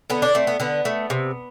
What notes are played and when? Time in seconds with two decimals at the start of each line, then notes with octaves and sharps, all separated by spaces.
0.10 D3 B3
0.22 D4
0.35 A3 C4
0.47 B3
0.60 D3 B3
0.85 A3
1.10 C3